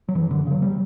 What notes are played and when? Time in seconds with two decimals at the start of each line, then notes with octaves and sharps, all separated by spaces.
0.09 F#3
0.15 F#2 E3
0.31 D3
0.47 C#3 F#3
0.62 G3